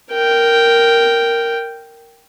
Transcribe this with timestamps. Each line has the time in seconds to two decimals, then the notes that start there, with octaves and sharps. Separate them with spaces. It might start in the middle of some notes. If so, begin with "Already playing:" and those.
0.12 A#4 G5